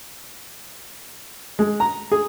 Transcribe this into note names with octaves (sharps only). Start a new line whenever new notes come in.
G#3
A#5
G#4